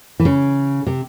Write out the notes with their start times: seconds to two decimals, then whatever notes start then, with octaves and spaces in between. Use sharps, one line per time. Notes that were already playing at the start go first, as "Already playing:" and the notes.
0.20 E3
0.25 C#3
0.86 C3